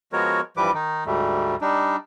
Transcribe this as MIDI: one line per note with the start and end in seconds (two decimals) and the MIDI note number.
0.13 0.41 53
0.13 0.41 56
0.13 0.41 59
0.13 0.41 66
0.13 0.41 70
0.13 0.41 73
0.57 0.71 43
0.57 0.71 52
0.57 0.71 53
0.57 0.71 55
0.57 0.71 71
0.57 0.71 86
0.74 1.04 51
0.74 1.04 63
1.06 1.56 38
1.06 1.56 44
1.06 1.56 55
1.06 1.56 57
1.61 1.96 55
1.61 1.96 62
1.61 1.96 63